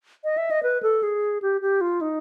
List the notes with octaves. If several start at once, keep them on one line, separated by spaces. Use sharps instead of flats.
D#5
E5
D#5
B4
A4
G#4
G4
G4
F4
D#4